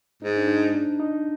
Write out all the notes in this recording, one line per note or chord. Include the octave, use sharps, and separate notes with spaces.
G#2 D#4
D4
D#4
D4
D#4